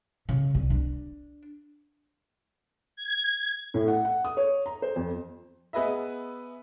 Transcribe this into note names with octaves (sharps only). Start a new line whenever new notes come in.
C#3
C2
D4
G#6
A2
F#5
F#5
D#6
C#5
A#5
C5
F2
B3 G#4 B4 D#5 E5